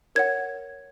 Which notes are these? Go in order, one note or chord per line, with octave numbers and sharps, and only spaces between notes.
A#4 C#5 F#5 G#6